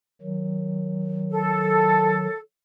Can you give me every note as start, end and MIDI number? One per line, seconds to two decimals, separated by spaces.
0.22 2.27 51
0.22 2.27 54
1.31 2.38 69